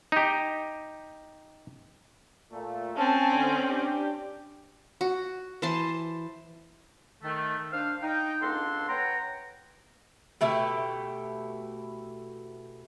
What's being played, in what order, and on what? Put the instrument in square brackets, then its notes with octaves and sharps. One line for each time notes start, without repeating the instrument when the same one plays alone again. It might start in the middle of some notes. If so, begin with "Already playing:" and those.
[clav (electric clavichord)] D#4 G4
[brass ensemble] A#2 A3
[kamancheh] C4 C#4 [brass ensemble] A5
[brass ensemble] D3 G#5
D4 G4
[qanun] F#4
E3 C5 A5 C6
[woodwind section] D#3 A3
D4 C5 F5
D#4 G5
C#2 A#3 D4 A4 F#5 C6
B4 C#5 F#5 G5 A#5
[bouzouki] B2 A3 E4 G4